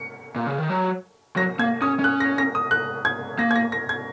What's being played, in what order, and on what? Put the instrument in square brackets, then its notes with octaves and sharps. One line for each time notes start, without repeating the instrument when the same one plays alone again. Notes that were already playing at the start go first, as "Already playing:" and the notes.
Already playing: [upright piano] C#7
[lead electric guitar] A#2
C#3
D#3
F#3
[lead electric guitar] F#3 [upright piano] A#6
[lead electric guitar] A#3 [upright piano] G#6
[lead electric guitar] C#4 [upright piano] D#6
[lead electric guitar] C#4 [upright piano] F#6
[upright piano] A#6
A#6
D#6
F#6
G#6
[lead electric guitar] A#3 [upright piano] A#6
[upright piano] G#6
A#6
A#6
G#6